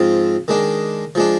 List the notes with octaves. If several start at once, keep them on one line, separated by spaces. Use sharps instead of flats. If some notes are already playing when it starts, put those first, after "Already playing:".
Already playing: G#2 F3 C4 F4
D#3 G#3 D4
F3 G#3 D4